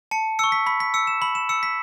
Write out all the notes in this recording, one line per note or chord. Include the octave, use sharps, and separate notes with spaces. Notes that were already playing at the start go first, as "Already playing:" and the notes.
A5 C#7
C#6 E6 C#7
B6
B5 B6
B6
E6 C#7
E7
B5 F#7
E7
E6 C#7
B6